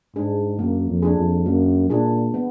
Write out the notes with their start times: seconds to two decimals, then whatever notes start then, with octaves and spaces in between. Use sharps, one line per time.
0.16 G#2 D4 G#4
0.59 F#2 A#3
0.89 F2
1.02 D4 G#4
1.18 F2
1.46 F#2 A#3
1.90 A#2 D4 G#4
2.34 B3